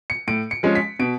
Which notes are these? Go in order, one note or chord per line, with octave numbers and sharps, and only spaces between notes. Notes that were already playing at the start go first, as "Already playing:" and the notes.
C#7
A2 D7
C#7
F3 G#3 C#4
B6
B2 D7